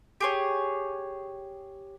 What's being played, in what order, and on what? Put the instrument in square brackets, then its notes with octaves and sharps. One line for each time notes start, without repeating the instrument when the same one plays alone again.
[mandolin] G4 G#4 C#5